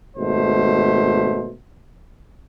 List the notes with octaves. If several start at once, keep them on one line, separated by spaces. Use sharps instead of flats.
G#1 B2 A3 C5